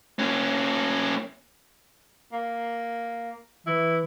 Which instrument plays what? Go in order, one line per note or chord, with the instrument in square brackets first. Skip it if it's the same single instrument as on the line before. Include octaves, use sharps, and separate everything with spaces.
[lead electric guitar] A#3 C#4
[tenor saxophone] A#3
[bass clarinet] E3 [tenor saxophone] E4